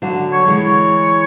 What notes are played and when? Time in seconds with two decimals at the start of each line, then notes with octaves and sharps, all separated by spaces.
0.02 D3 F#3
0.33 C#5
0.48 E3 G#3
0.64 C#5